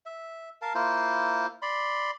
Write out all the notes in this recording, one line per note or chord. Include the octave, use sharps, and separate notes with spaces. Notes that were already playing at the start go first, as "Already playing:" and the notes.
E5
A#4 F5 A5
A#3 E4 F4 C5
D5 B5 C6